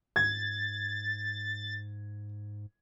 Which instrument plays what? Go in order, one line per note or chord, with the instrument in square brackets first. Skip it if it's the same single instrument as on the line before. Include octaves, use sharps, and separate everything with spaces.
[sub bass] G#2 [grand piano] G#6 [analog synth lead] A6